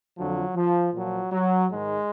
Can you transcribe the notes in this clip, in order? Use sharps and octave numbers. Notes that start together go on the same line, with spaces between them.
F2 D3 F3 F#3
F3
A#2 F3 F#3
F#3
G#2 D#3 G#3